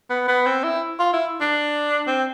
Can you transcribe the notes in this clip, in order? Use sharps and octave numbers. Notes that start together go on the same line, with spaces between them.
B3
B3
C4
E4
F4
E4
D4
C4